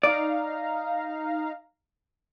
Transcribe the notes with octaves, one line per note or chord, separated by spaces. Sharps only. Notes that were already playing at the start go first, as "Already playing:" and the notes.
D#4 D5 F5 A#5